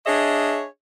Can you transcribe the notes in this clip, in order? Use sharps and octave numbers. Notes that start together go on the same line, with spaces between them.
D4 G#4 C#5 D#5 E5